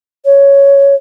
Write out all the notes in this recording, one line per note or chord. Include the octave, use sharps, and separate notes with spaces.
C#5